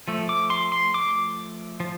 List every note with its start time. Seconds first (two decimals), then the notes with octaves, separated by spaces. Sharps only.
0.08 F3 A3
0.29 D6
0.50 C6
0.72 C6
0.94 D6
1.80 F3